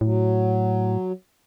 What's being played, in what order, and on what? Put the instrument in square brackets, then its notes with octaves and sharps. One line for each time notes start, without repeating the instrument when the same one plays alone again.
[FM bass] A2 [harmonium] F#3